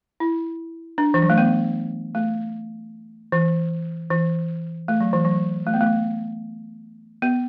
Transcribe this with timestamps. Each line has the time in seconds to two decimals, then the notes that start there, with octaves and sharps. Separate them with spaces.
0.20 E4
0.98 D4
1.14 E3
1.22 F#3
1.30 A3
1.38 B3
2.15 A3
3.32 E3
4.10 E3
4.88 A3
5.00 F#3
5.13 E3
5.25 F#3
5.66 A3
5.74 B3
5.81 A3
7.22 B3